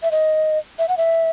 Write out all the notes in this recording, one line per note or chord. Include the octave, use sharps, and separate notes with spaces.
E5
D#5
E5
F#5
E5